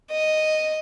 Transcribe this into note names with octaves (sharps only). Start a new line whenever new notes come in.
D#5